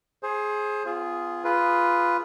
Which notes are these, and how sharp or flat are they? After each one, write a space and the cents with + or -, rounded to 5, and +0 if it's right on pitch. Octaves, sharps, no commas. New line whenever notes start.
G#4 +15 C5 +25
B3 +30 F4 -10 G#4 +0
F4 -5 G#4 +0 B4 +0